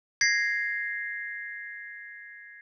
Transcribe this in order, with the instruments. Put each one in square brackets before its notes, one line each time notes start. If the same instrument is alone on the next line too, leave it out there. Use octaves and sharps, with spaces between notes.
[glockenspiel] G#6 A#6 C7